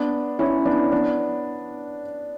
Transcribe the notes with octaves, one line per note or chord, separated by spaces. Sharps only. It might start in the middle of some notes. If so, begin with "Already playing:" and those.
Already playing: B3 D4
C#4 E4
B3 D4
B3 D4